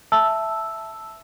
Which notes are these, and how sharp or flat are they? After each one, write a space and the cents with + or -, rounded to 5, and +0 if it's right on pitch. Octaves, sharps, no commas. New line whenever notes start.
E5 +5 A5 -5 E6 +0